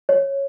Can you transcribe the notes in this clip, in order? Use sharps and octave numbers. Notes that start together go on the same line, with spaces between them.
C#5